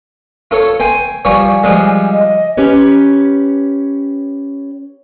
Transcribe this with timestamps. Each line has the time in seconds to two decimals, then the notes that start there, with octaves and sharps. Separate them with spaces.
0.51 F4 A4 C#5
0.80 C5 G5 G#5
1.25 F3 G3 C#5 G#5
1.64 F3 G3 G#3
2.12 D#5
2.57 C#4 G4 B4 C#5